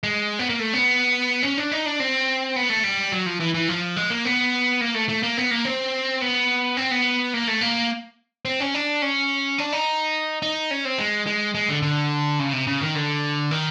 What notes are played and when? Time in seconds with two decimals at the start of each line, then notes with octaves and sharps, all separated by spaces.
0.03 G#3
0.39 B3
0.49 A#3
0.59 A3
0.73 B3
1.43 C#4
1.58 D4
1.72 D#4
1.86 D4
2.00 C4
2.56 B3
2.69 A3
2.84 G3
3.12 F#3
3.26 F3
3.40 E3
3.54 E3
3.68 F3
3.96 G#3
4.10 A#3
4.25 B3
4.81 A#3
4.94 A3
5.09 A3
5.23 A#3
5.37 B3
5.51 A#3
5.65 C4
6.21 B3
6.77 C4
6.91 B3
7.34 A#3
7.48 A3
7.61 A#3
8.45 C4
8.60 C#4
8.74 D4
9.02 C#4
9.58 D4
9.73 D#4
10.42 D#4
10.71 C#4
10.85 C4
10.99 G#3
11.27 G#3
11.55 G#3
11.69 D3
11.82 D3
12.39 C#3
12.53 C3
12.67 C#3
12.81 D#3
12.95 D3
13.51 D#3